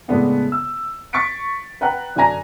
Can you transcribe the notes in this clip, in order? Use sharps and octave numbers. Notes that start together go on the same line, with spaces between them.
A2 C#3 G#3 A3 B3 D4
E6
C#6 A6 B6 C#7 D7
B4 F#5 G5 A#5 B5 F#6
F#2 D3 D4 G#5 A#5 A#6